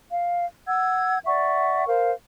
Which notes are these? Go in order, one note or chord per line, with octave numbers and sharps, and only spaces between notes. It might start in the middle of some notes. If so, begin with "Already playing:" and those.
F5
F#5 E6 G#6
D5 E5 F#5 C#6
A#4 C5 F5